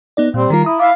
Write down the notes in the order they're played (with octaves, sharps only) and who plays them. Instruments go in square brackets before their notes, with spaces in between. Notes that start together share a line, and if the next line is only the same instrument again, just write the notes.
[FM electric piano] B3 D#4 D5
[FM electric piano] A#2 [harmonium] G3 C4
[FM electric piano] D#3 G3 F4 [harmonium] A#4
[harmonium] E4 [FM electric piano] A#5 D#6
[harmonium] E4 E5 [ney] F5 [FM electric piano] D6